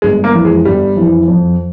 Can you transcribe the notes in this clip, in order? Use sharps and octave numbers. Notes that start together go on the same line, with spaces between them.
G1 G#3
A#3
F2 E3
G#3
G1 G3
F2 E3
F2